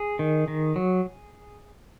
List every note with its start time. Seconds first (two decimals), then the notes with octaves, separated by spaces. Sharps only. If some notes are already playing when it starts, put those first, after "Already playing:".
Already playing: G#4
0.19 D#3
0.48 D#3
0.76 F#3